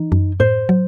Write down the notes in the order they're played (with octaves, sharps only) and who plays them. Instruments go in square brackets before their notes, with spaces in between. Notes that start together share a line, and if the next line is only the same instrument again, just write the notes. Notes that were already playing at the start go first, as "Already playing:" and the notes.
Already playing: [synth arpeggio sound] E3 [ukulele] D#4
[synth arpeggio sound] F#2
[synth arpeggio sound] A2 [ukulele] C5
[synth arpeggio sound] F#3